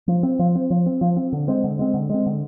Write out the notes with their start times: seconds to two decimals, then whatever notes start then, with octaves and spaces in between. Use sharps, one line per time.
0.08 F3
0.23 C4
0.39 F3
0.55 C4
0.70 F3
0.86 C4
1.01 F3
1.17 C4
1.33 D3
1.48 G#3 C4
1.64 D3
1.79 G#3 C4
1.94 D3
2.10 G#3 C4
2.26 D3